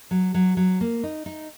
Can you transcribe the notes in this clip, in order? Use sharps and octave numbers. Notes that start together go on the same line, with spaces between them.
F#3
F#3
F#3
A#3
D#4
D#4